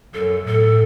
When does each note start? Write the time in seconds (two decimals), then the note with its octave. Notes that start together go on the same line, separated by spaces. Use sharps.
0.14 F#2 A4
0.46 A2 A4